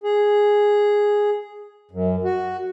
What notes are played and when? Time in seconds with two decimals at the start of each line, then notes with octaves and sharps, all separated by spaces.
0.04 G#4
1.91 F#2
2.24 F#4